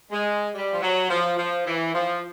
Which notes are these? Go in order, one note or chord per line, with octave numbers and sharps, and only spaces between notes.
G#3
G3
F3
F#3
F3
F3
E3
F3